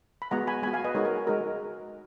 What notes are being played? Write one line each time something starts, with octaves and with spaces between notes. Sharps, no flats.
B5
G#3 B3 F#4 F#5 A#5
G#5 B5
G#3 B3 F#4 G#5 B5
F5 G#5
B4 D#5
G#3 D#4 F#4 A#4 C#5
A#4
G#4
G#3 D#4 F#4 A#4